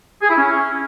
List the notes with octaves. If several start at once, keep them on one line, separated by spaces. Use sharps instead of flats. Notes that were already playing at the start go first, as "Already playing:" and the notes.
G#4
E4
C#4